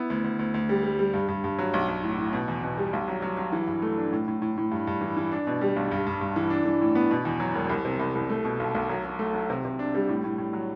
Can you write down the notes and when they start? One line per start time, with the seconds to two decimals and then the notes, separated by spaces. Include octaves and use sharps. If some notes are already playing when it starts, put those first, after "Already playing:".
Already playing: B3 E4
0.10 D2
0.24 D2
0.39 D2
0.54 D2
0.69 G3
0.83 G3
0.99 G3
1.14 G2
1.28 G2
1.44 G2
1.59 F#3
1.74 B1
1.88 B1
2.03 A2
2.18 A2
2.33 B2
2.48 E2
2.63 B2
2.77 G3
2.93 B1
3.08 F#3
3.22 F#3
3.37 F#3
3.52 E3
3.67 G2
3.82 A3
3.98 D4
4.13 A2
4.28 A2
4.42 A2
4.57 A2
4.71 G2
4.87 G2
5.01 E3
5.17 E3
5.32 D4
5.47 B2
5.61 G3
5.76 B1
5.91 G2
6.07 G2
6.21 G2
6.36 E3
6.50 D4
6.66 E3
6.81 A2
6.95 B3
7.11 B2
7.25 E2
7.40 F#3
7.55 E1
7.70 C2
7.85 C3
8.00 C2
8.15 C2
8.30 A3
8.45 B2
8.60 B1
8.75 B1
8.89 F#3
9.05 F#3
9.19 A3
9.34 F#3
9.50 C3
9.65 C3
9.79 D4
9.95 G3
10.09 A2
10.24 A2
10.38 A2
10.53 F#3